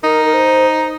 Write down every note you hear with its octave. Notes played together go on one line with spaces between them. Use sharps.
D#4 A#4
A#4
C5